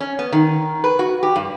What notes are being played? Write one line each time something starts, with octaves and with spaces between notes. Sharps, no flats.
C#4
B3
D#3
B4
F#4
G4
G2